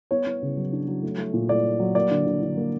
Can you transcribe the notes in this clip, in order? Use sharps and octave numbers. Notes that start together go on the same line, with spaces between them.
B3 C#5
B3
C#3
F#3
D4
F#3
A3
A3
A#2
A3 D5
A3
F#3
A#3 D5
D3
D3
D3
A#3